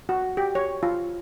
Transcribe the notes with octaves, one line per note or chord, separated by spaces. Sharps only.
F#4
G4
C#5
F4